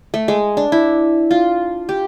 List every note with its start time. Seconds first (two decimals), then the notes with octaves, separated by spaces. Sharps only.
0.14 A3
0.28 G#3
0.57 D4
0.72 E4
1.31 F4
1.89 G4